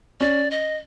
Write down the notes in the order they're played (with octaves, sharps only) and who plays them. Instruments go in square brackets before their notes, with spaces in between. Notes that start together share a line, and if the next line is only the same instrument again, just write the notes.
[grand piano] C#4 [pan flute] D5
[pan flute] D#5